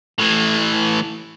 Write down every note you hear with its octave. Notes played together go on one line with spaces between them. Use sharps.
A2 E3